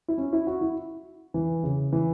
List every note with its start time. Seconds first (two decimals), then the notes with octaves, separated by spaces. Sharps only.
0.08 E4
0.18 C#4
0.33 E4
0.47 F#4
0.61 E4
1.34 E3
1.63 C#3
1.92 E3